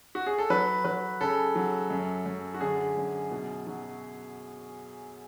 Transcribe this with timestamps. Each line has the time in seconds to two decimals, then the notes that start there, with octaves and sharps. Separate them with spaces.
0.15 F#4
0.26 G#4
0.38 A4
0.50 F#3 B4
0.85 F#3 B4
1.21 C#3 A4
1.56 F#3
1.90 F#2
2.26 F#2
2.54 F#4
2.61 D3 G#4
2.97 F#2
3.31 B2
3.67 F#3